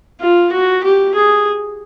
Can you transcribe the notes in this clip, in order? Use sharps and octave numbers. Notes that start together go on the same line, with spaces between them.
F4
F#4
G4
G#4